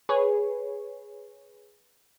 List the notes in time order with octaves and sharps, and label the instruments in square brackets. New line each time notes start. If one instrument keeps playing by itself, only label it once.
[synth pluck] G#4 B4 C#5